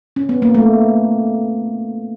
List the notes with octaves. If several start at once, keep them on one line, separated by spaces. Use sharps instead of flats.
C#4
B3
A#3
A3